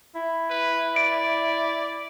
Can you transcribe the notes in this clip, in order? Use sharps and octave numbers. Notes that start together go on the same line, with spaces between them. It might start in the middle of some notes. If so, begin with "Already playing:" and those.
E4
B4
D5 D7